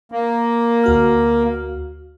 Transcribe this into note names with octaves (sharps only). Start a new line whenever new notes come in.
A#3
D2 F#4 F6